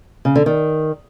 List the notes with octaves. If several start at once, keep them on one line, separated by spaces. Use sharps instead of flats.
C#3
D3
D#3